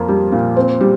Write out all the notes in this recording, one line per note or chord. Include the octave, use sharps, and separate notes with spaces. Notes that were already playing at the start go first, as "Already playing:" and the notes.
Already playing: F2 A#3
G3
A#2
C4
G3